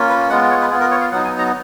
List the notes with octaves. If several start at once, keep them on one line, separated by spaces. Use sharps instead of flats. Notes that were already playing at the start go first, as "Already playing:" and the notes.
Already playing: A#3 C#4 F4
B4
G#3 B3 F4 F#5
C#5
B4
B3 F4 G#4
A#4
C#5
F5
F#3 B3 D#4 F#5
G#5
A#5